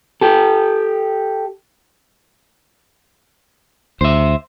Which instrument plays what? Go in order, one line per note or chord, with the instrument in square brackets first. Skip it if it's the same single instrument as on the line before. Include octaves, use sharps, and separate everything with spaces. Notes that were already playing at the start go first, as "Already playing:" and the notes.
[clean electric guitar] G4 A4
[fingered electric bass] D2 [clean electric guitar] C5 E5